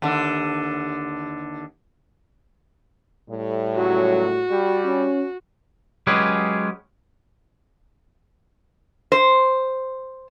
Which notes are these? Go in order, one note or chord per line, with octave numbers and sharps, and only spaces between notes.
D#2 D3
A2 G3
C#2 F#3 F#4
G3
C#4
F#3 G#3 C#4 G4 G#4 B4
C5